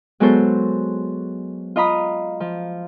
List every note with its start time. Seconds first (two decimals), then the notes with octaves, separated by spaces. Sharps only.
0.20 F#3 G#3 B3 F#4 A4 C5
1.76 F4 D#5 A#5 B5 D#6
2.40 F3